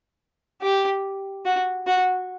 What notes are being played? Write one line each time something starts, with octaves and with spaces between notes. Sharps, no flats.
G4
F#4
F#4